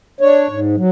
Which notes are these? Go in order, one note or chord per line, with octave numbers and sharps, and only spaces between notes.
D4 C#5
G#2
F#3